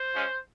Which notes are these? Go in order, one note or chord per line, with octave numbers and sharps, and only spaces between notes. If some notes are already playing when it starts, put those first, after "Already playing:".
Already playing: C5
G#3 C#4 F4